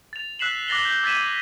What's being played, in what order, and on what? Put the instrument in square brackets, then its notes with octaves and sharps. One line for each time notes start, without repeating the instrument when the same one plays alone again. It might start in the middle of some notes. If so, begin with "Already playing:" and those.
[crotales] A6 F7
E6 F#6 B6 C7 E7 F#7
D6 F#6 A6 A#6 C7 G7
G6
E6 G#6 A6 B6 D#7 E7